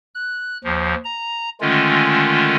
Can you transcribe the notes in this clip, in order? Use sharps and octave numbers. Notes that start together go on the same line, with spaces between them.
F#6
D#2 F3
A#5
D3 D#3 G#3 A3 C#4 F4